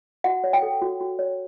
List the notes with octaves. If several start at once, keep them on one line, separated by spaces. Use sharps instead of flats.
F#4 F#5
C#5
G5
A4
F#4
F#4
C#5